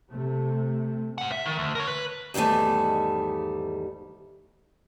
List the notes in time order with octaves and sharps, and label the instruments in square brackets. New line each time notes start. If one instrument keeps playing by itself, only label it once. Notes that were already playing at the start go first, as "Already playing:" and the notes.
[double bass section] C3 A3
[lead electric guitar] G#2 F#5
E5
D#3
D2
A#4 C#5
B4
[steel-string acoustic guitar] E2 G#2 D#3 G3 A3